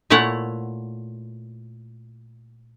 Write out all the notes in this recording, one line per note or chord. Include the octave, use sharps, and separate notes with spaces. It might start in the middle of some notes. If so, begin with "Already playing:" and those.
A#2 A3 E4 C#5 F#5